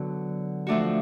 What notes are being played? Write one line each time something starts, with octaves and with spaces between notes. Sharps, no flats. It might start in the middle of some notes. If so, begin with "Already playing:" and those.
Already playing: D3 F#3 B3
F3 A3 D4 F#4